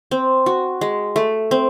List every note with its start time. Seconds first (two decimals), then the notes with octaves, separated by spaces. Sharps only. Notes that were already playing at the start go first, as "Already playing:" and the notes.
0.11 C4
0.46 F#4
0.81 G#3
1.16 A3
1.51 C4